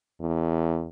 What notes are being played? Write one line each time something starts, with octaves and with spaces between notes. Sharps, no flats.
E2